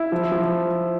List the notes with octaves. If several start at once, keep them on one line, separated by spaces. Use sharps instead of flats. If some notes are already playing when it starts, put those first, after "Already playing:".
Already playing: E4
F3
F3